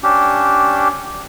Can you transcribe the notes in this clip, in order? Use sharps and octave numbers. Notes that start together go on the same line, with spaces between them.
C#4 D4 G4